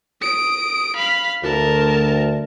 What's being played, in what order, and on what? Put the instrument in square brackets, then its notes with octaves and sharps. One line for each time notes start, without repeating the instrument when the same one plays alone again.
[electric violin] D#6 D7
F5 B5
[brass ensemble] D2 [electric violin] A#4 A5